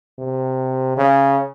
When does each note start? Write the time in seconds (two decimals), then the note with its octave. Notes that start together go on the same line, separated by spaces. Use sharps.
0.19 C3
0.97 C#3